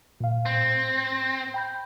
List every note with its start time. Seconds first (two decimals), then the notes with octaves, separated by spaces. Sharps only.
0.20 A#2 F5
0.46 A2 C4
1.54 G5 B5 G6